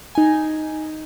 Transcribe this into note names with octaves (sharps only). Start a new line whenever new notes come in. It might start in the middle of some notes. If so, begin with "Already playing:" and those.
D#4 G#5